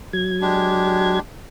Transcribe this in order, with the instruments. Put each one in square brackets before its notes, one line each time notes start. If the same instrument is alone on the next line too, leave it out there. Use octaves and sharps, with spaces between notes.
[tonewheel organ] F#3 G#6
[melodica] G#3 D4 G4